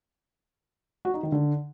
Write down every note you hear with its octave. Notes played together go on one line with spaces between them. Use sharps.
F#4
D#4
D#3
D3